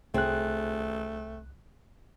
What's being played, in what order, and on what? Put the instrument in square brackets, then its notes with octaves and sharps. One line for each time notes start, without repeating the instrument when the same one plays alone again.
[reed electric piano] C2 F#6 [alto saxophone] A3 [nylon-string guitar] C4 G#4